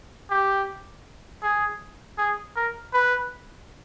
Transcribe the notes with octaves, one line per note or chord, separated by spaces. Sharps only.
G4
G#4
G#4
A#4
B4